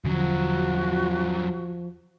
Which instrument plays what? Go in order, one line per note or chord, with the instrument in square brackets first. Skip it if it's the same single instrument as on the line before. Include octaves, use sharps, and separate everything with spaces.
[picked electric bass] E1 D3 C#4 [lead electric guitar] E2 F#3 [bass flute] F3 [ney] F#4